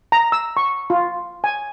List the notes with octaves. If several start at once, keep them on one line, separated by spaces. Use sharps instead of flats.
A#5
E6
C#6
F4
G#5